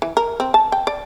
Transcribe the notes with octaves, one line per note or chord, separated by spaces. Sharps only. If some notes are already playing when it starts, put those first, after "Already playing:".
E3
A#4
C4
A5
G5
D5